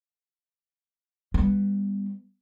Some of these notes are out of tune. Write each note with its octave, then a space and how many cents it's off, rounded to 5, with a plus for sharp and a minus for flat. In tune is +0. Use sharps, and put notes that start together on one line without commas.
G3 +30 B3 +0